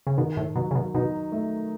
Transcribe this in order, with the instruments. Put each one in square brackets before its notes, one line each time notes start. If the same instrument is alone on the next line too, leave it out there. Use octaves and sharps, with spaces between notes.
[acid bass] C#3
[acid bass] B2 [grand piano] D#3
[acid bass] A2
[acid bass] B2 [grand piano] F#3
[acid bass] C#3
B2
[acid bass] B2 [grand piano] D#4
[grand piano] A3